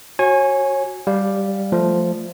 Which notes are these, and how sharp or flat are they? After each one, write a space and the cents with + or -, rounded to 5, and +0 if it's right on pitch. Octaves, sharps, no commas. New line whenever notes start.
F#4 +0 C#5 -30 G#5 +0
G3 +0 G4 +0 F5 +0
F3 +0 A3 +0